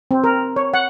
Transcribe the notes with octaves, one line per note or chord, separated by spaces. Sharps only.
C4
A#4
C#5
F#5